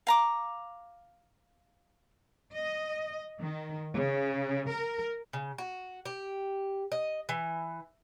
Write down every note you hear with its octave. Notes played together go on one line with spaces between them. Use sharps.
F5 A#5 D6
D#5
D#3
C#3
A#4
C#3
F#4
G4
D#5
E3